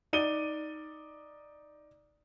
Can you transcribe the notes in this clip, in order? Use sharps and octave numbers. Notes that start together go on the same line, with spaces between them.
D#4 D5 D#7 G7